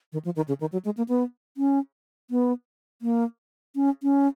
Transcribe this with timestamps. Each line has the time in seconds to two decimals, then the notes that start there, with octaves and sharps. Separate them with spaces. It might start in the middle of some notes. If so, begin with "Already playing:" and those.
0.13 D#3
0.25 F3
0.36 D#3
0.48 C#3
0.60 D#3
0.72 F#3
0.85 G#3
0.97 A#3
1.08 B3
1.57 C#4
2.30 B3
3.02 A#3
3.75 C#4
4.03 C#4